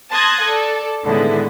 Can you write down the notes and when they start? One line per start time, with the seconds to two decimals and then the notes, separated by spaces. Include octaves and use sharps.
0.11 A5 C6 D#6 F#6 G#6 A#6
0.44 A4 D5
1.04 A2 D3 D#3 G#3 B3 E4